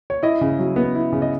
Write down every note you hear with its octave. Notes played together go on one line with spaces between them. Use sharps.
C#5
E4 D#5
C#3
F#3
B3
E4
C#3
D#5